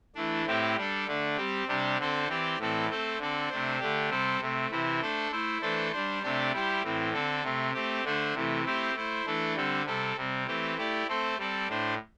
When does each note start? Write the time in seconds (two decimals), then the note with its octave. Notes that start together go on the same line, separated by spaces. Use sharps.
0.15 E3 A3 D4
0.46 A2 A3 C4 E4 G4
0.76 G3 D4 A4
1.06 D3 A3 D4
1.37 G3 C4 G4
1.67 C3 G3 D4 G4
1.97 D3 C4 A4 C5
2.28 E3 C4 G4 D5
2.58 A2 E3 C4 A4 D5
2.88 A3 C4 A4 C5
3.18 D3 C4 A4 D5
3.49 C3 A3 D4 C5
3.79 D3 A3 D4 G4
4.09 C3 G3 C4 A4 C5
4.40 C3 A3 C4
4.70 C3 E3 C4 E4
5.00 A3 D4 A4 C5
5.31 A3 E4 C5
5.61 E3 A3 D4 A4 C5
5.92 G3 D4 C5
6.22 C3 A3 D4 G4 D5
6.52 G3 E4 G4 C5
6.83 A2 E3 C4
7.13 D3 C4 A4
7.43 C3 A3 C4
7.73 A3 C4 G4
8.04 D3 A3 D4 C5
8.34 C3 E3 A3
8.65 A3 C4 E4 G4 C5
8.94 A3 E4 C5
9.26 E3 A3 D4 A4
9.55 D3 G3 C4 A4
9.86 C3 G3 C4 A4
10.16 C3 G3 C4
10.47 E3 A3 C4 G4
10.76 A3 E4 G4 D5
11.07 A3 C4 A4 C5
11.38 G3 C4 A4 D5
11.67 A2 A3 D4 C5